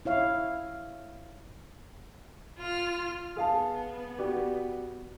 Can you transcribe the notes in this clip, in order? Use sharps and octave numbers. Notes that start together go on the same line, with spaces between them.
E4 C#5 F5
F4 F6
B3 G#4 F5 A5
F#4 G4 D5